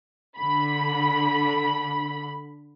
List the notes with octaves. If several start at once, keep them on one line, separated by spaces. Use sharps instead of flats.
D3 B5